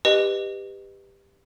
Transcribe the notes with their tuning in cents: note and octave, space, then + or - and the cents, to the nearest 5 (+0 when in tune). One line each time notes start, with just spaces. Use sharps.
G4 +15 B4 +5 D#5 -15